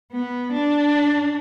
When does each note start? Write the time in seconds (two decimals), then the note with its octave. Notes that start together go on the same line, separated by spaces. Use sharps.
0.12 B3
0.53 D4